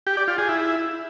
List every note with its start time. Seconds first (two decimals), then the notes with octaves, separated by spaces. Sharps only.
0.07 G4
0.17 D5
0.28 F4
0.38 G#4
0.49 E4